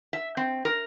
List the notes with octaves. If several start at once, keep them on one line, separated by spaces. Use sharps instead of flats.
E5
C4
A#4